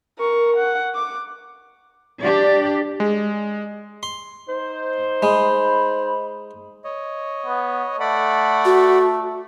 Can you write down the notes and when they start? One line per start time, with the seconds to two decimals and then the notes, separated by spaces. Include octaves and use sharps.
0.19 A#4 C#6
0.56 F#5
0.95 D6
2.22 D4 G4 D5
3.00 G#3
4.03 C6
4.49 D#4 C5
5.23 G#3 B5
6.84 C#5 D#5
7.46 B3
8.00 A3 D5 F#5 B5
8.65 F#4